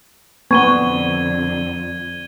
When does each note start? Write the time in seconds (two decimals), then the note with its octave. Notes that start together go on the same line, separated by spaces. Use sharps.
0.51 F2 D3 B3 C#6 G#6 D#7 G7